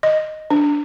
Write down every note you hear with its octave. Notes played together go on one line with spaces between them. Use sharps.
D#5
D4